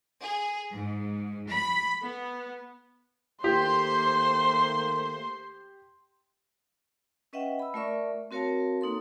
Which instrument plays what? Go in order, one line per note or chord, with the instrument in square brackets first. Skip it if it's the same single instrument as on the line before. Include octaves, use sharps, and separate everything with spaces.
[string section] G#4
G#2
B5
B3
[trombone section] D#3 A3 A#3 [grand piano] G4 [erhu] C5 [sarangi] C6
[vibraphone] C#4 B4 D#5 E5 F#5 G5
B5 E6
A3 F4 A#4 D5 E5 C#6
C4 F#4 A#4 C#5 F5 A5
A#3 D#4 A4 C6